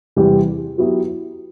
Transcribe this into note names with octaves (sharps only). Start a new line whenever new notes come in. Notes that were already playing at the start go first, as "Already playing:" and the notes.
E2 C3 G3 C4 G4
F#3 B3 E4 G4